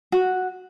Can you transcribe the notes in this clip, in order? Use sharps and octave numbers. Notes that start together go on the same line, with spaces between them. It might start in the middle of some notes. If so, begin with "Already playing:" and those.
F#4